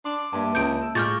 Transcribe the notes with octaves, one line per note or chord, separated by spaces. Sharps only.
D4 C6 D6
G2 A#3 A5
C#2 G6 D7
E6
A2 G#3 F4 C#6 D6 F6 G6 A6